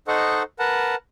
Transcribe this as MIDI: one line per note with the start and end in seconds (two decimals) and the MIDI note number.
0.08 0.43 63
0.08 0.43 69
0.08 0.43 72
0.08 0.43 75
0.08 0.43 78
0.08 0.43 85
0.59 0.95 70
0.59 0.95 71
0.59 0.95 78
0.59 0.95 81